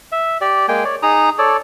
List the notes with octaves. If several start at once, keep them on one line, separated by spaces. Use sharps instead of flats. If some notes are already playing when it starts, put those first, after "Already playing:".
E5
G4 D5
G#3 A#3 G5 G#5
C#5 D5
D#4 G#4 A#5 D#6
A4 C#5 D5